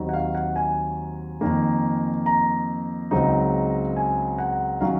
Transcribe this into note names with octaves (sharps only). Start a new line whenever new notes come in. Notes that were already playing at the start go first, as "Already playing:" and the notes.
Already playing: D#2 D#3 F#3 C4 D#4
F#5
F5
F#5
G#5
F2 D#3 A#3
A#5
C#2 C#3 F#3 C4 D#4
G#5
F#5
D#3 F#3 C#4 F5